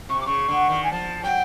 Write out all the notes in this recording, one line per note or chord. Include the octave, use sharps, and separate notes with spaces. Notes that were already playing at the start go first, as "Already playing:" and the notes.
C3 C#6
D6
C#3 C#6
D3
D#3
G#5
F3 A5
F#3 G5